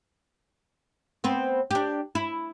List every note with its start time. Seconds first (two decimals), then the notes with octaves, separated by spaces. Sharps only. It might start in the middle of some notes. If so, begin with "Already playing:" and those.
1.24 B3 C4
1.71 D4 G4
2.15 E4